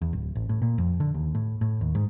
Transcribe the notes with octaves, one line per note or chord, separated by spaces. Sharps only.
E2
D1
A1
A2
A#2
F2
D3
D#2
A2
A2
D#2
G#2